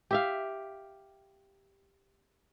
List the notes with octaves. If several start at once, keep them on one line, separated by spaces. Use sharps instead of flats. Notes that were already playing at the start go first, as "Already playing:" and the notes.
G4 E5 F5